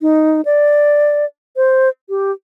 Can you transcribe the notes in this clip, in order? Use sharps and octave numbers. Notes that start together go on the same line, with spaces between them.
D#4
D5
C5
G4